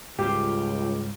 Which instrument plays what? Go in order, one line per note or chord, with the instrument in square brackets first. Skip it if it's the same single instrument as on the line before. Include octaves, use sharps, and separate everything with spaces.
[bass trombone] C#2 [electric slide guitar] G#2 G3 F4 [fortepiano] G4